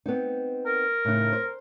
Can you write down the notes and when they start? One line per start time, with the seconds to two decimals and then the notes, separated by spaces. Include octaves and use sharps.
0.06 B3 C4 D#4
0.66 A#4
1.05 A2 C#3 D#4
1.33 C5